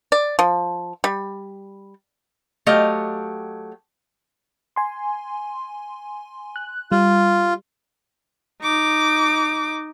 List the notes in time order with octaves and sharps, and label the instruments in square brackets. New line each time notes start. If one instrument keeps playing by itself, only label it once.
[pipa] D5
F3
G3
[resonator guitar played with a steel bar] F#3 A3 G4 D#5 F5
[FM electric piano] G#5 C6
F#6
[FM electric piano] G3 [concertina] F4
[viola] D#4 D6